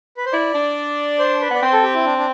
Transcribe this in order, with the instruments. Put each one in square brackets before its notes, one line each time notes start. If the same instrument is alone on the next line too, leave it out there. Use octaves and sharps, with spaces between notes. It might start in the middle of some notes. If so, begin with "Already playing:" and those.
[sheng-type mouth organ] B4
C5
[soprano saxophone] E4 [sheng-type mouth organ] D5
[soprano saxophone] D4
[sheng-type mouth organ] C5
B4
[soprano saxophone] B3 [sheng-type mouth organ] D5
[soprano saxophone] C4 [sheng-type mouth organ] C5
[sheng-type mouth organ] A4
G4
E4
D4
D4